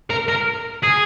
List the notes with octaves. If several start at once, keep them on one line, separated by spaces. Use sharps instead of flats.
A#4
A#4
G#4